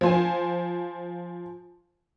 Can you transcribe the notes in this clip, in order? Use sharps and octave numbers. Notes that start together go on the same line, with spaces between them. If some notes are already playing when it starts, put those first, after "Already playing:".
F3 C5 G#5